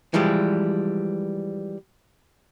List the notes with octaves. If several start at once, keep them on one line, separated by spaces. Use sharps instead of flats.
E3 F3 G3 G#3